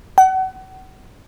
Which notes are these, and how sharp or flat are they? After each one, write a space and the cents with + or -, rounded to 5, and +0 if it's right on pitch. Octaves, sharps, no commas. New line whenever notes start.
F#5 +35